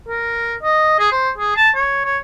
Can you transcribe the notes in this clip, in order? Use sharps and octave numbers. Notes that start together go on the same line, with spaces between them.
A#4
D#5
G#4
C5
G#4
A5
C#5
C#5